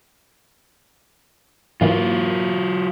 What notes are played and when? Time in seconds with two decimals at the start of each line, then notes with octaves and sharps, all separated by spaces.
1.81 G#2 E3 F#3 A#3 F4